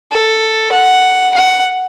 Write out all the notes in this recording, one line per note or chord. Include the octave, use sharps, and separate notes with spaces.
A4
F#5
F#5